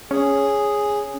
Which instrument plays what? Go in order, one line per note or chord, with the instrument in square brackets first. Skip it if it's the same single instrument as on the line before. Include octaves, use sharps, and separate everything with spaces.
[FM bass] C#4 [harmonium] G#4